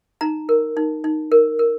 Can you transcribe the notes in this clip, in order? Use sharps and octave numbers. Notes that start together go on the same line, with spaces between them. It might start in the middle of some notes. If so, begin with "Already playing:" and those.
D#4 A#5
A#4
D#4
D#4
A#4
A#4